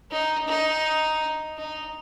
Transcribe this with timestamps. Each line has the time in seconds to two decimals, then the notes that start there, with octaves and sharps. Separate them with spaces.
0.11 D#4
0.48 D#4
1.57 D#4